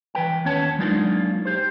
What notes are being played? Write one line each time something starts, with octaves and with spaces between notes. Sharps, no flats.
E3 B4 G5
D#2 B3 C#4 C#5 A5
F#3 G#3 A#3 D4 D#4 F4
G4 C5